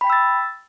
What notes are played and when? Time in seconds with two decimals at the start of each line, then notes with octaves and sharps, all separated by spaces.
0.01 B5
0.04 G5
0.07 B6
0.10 E6
0.13 A6